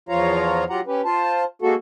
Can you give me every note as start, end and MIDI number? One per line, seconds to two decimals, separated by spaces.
0.09 0.64 40
0.09 0.64 53
0.09 0.64 65
0.09 0.64 73
0.09 0.64 77
0.09 0.64 82
0.70 0.81 54
0.70 0.81 65
0.70 0.81 67
0.70 0.81 78
0.70 0.81 82
0.87 1.01 61
0.87 1.01 67
0.87 1.01 71
1.05 1.44 65
1.05 1.44 72
1.05 1.44 81
1.62 1.75 56
1.62 1.75 58
1.62 1.75 66
1.62 1.75 69